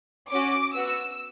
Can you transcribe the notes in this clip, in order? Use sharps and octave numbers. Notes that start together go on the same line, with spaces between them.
C#4 F#4 D6
B3 F#4 E6